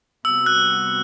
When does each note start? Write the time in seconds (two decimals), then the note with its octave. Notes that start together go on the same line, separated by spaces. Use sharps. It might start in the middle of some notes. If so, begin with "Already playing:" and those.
0.25 C3 G3 B3 F#4 E6
0.46 F#6